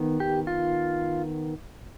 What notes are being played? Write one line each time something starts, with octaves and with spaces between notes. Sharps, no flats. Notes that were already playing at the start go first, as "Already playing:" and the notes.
Already playing: D#3 B3
G4
F4